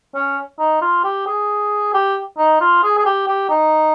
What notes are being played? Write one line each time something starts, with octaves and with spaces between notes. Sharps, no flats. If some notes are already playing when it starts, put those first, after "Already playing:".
C#4
D#4
F4
G4
G#4
G4
D#4
F4
G#4
G#4
G4
G4
D#4